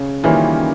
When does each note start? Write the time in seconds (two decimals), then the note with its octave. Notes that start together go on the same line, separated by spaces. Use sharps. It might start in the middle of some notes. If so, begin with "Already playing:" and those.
Already playing: C#3
0.23 D#3 E3 G3 A#3 C#4 F4